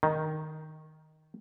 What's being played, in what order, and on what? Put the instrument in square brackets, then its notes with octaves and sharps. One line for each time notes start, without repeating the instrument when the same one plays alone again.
[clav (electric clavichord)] D#3